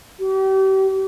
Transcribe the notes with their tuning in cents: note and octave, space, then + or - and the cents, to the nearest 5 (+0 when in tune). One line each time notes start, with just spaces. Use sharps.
G4 -40